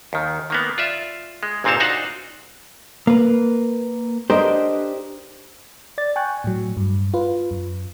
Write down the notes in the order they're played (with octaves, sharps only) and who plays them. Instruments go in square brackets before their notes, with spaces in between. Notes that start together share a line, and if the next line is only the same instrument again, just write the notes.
[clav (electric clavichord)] D#2 D#3
D#3 A#3 B3
F4 D5 E5
G#3
G1 A#2 C4 D#4 C#5 A5
D4 D#4 F#4 C5 F5 F#5
[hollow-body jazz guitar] A#3 B4
[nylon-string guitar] D4 A#4 D#5 [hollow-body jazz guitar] G4 C5
[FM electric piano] D5 A6
G5 G#5 C#6 F#6
A2 F#3
G2
F4 B4
F#2